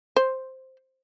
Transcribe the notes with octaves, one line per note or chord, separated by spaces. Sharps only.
C5